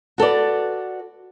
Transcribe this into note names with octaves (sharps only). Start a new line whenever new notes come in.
F#4 A4 B4 D5